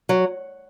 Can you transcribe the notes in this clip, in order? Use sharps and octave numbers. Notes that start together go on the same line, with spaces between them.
F#3